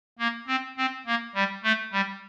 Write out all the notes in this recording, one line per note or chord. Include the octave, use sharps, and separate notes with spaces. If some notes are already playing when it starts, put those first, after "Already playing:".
A#3
C4
C4
A#3
G3
A3
G3